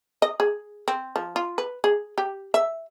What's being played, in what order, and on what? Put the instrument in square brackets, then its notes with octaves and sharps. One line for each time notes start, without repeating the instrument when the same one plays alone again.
[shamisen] D#5
G#4
C4
F3
F4
B4
G#4
G4
E5